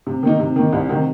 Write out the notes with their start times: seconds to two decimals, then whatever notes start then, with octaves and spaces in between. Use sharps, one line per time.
0.07 C3
0.23 D#3 A#3 D#4
0.40 C3
0.56 D#3 A#3 D#4
0.73 C2
0.89 C3 D#3